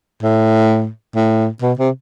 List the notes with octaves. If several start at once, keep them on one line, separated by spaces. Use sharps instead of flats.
A2
A2
B2
C3